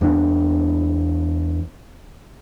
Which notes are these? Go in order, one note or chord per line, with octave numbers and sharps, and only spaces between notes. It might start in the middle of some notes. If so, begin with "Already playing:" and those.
E2 A#3 B3 D4